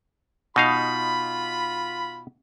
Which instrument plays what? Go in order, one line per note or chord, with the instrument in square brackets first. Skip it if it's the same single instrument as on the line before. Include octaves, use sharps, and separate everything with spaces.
[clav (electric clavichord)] B2 D#4 F5 [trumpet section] F4 B5